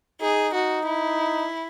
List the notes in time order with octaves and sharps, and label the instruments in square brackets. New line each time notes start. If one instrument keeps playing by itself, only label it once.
[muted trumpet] D#4 [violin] G#4
[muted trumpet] D#4 [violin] F#4
[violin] E4